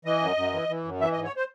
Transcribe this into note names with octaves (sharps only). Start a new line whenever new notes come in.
E3 D#5
F#2
F#2
E3
E3
F#2
E3 E5
D#5
G#2
C#5
C5